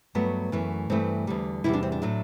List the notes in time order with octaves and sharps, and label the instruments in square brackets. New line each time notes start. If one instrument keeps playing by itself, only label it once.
[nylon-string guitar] G2 F#3 A3 B3
F#2 E3 A3
G2 E3 A3 C4
E2 D3 G3
E2 C3 G3 E4
D4
C4
D4
A2 F#3 A3